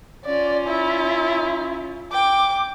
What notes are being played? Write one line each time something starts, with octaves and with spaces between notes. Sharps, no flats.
C#4 F4 D5
E4
G5 D6